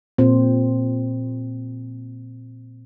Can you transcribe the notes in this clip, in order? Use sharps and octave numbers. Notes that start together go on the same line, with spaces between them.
A#2 C4 C5